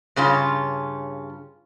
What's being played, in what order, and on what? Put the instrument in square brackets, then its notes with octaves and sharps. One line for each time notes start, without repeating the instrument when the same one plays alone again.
[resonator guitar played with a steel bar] G2 C#3 C#4 F4